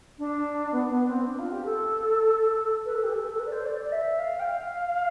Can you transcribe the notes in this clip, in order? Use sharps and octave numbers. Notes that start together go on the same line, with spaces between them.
D4
B3
B3
C4
D4
F4
G4
A4
B4
A4
G4
A4
A4
B4
D5
C5
D5
D5
E5
F5
G5
F5